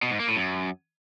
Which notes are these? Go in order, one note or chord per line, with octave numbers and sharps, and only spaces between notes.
B2
G#2
A#3
A2
F#2